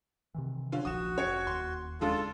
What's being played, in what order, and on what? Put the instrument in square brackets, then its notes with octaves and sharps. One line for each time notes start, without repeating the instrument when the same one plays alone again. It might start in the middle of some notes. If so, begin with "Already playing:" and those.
[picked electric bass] C3 D#3 E3
[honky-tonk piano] D3 C#4 F4
[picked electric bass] D1 A#1 F3 [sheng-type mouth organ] F#4 [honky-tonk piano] D#6 E7
[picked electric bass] F1 C#4 [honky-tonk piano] C#5 G#6 C#7
[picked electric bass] E1 D#2 [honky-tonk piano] C6
[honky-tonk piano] C#3 G#3 D4 [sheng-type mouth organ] F4 A4